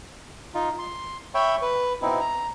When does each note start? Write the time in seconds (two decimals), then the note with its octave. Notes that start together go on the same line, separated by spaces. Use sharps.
0.55 D#4 F4
0.79 C6
1.35 C#5 E5 G5 B5 C#6
1.62 B4
2.02 B2 C4 D#4 E4
2.20 A#5